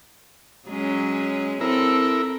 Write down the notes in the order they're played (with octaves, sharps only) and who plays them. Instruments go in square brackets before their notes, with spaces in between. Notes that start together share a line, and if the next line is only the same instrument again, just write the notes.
[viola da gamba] F#3 G#3 C#4
[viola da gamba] C4 A4 [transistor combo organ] E4 A#4